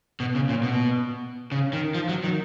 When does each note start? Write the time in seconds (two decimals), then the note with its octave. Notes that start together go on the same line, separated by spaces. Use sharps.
0.20 B2
0.35 C#3
0.49 A#2
0.63 B2
1.52 C#3
1.73 D#3
1.95 F3
2.09 F#3
2.24 D#3